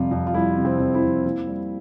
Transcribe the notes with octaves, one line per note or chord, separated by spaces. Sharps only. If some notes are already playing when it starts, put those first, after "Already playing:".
Already playing: F2 C3 G3 F4
F2
F4
G3 E4
C3
C4
F2
E4
F2
A#3 E4
G3